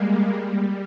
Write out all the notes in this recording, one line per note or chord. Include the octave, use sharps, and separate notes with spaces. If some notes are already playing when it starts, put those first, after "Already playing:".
Already playing: G3 G#3 A#3
G3